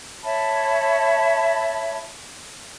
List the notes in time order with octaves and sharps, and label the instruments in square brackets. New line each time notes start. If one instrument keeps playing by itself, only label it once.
[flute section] C#5 E5 A5 B5